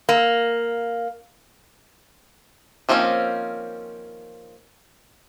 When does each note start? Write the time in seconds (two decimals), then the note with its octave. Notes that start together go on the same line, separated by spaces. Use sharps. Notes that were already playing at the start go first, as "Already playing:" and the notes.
0.09 A#3
2.89 D#3 F3 A#3 C4 C#4